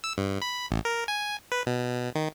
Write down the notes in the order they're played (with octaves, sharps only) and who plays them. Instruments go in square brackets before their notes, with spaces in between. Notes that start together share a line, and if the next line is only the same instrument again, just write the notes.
[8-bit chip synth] E6
G2
B5
A1
A#4
G#5
B4
B2
D#3